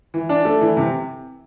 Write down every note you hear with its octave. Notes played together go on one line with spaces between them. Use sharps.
E3
D4
A3
E3
C3